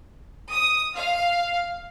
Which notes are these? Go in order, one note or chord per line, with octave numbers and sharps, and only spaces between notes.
D#6
F5